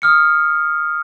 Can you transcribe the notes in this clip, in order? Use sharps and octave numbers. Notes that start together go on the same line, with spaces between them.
D#6 F6 C#7